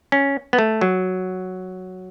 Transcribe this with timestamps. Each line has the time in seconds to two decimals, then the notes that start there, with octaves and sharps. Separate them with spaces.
0.12 C#4
0.53 B3
0.59 A3
0.81 F#3